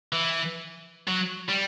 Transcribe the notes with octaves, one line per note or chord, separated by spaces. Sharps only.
E3
F#3
G3